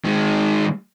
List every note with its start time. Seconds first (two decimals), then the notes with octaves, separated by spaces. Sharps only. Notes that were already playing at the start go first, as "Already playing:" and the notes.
0.05 D#3 G#3